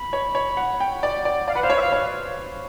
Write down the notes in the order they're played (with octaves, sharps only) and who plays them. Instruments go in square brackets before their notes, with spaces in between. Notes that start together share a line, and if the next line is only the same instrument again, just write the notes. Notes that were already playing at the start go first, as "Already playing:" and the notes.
Already playing: [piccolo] B5
[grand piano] C#5
C#5
F#5
G5
D5
D5
[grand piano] D5 [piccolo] F5
[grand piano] B4 [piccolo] F#5
[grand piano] C5 [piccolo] F5
[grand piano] C#5
[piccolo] E5
F5
[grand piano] C#5